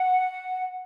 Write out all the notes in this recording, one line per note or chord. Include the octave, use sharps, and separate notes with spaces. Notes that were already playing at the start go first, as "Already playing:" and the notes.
Already playing: F#5